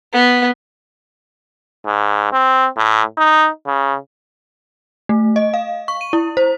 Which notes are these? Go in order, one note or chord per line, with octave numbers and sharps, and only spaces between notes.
B3
G#2
C4
A2
D#4
C#3
A3
D#5
F5
C#6
D#7
E4
C5